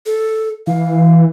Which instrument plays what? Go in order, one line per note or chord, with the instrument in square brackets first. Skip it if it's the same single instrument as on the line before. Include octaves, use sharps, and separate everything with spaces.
[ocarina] A4
[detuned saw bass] E3 [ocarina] F5